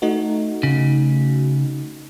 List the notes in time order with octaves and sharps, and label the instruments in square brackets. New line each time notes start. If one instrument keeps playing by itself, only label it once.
[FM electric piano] A3 D#4 F#4
[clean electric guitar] C#3